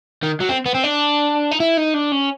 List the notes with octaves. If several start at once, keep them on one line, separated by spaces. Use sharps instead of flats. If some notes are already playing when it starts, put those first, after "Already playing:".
D#3
F#3
C4
B3
C4
D4
D#4
E4
D#4
D4
C#4